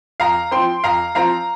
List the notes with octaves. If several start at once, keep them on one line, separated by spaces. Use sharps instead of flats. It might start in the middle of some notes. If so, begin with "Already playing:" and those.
F2 F5 A#5
F3 C4 G5 C6
F2 F5 A#5
F3 C4 F5 A#5